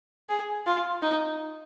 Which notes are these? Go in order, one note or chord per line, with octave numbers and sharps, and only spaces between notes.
G#4
F4
D#4